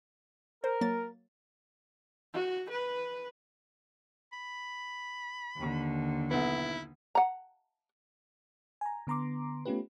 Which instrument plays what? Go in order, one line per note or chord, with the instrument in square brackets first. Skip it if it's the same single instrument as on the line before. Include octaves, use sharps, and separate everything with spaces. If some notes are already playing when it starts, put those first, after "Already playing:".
[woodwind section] A#4 [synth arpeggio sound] C5
[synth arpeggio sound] F#3 A#3 A6
[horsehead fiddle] F#4
B4
[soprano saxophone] B5
[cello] D#2 D3
[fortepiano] B1 B3 [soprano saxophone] E4
[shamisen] F#5 A#5
[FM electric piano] G#5 A#5
D3 B3 A#5 C6 D6
A3 B3 C#4 F4 G4 B4